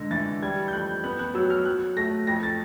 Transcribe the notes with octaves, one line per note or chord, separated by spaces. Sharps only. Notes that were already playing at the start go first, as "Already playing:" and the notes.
Already playing: G#2 D3 A#6
E3 A6
G3 G#6
G6
F2 F#6
B3 F#6
F#6
F#3 E6
F6
F#3 F#6
A3 A#6
F2 A#6
A6